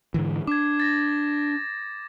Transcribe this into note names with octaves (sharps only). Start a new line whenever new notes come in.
G#2 D3 E3
D4 D6 G#6
A6 A#6